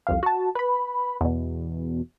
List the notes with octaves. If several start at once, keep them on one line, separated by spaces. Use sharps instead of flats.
C2 F2 F5
F#4 A5
B4 B5
E2 B2